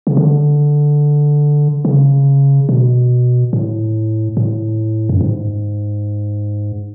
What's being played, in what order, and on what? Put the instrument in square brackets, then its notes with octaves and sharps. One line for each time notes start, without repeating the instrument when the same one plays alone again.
[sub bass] C#3
D3
C#3
B2
A2
A2
F#2
G#2